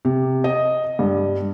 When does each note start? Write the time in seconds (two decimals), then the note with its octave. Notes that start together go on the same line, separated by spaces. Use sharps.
0.05 C3
0.44 D#5
0.99 G2